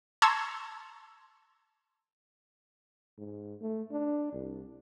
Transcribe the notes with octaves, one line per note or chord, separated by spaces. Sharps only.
A5 A#5 C6 C#6 E6 G#6
G#2
A3
D4
C2